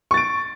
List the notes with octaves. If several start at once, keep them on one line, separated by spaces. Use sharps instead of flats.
C#6 A6 D7